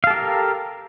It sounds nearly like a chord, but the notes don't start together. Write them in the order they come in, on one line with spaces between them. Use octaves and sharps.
F5 A4 G4 A#4